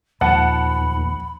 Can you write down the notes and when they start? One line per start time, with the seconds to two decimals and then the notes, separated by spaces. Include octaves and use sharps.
0.21 D#2 A#2 F3 F#5 A5 B5